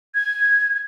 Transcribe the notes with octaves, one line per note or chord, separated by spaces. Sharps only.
G#6